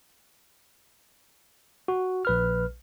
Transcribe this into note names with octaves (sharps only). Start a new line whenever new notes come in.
F#4
A#1 B4 F6